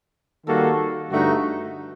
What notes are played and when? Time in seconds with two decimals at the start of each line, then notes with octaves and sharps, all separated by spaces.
0.47 D#3 G3 A#3 F#4 A4
1.10 G2 D3 A3 D#4 F#4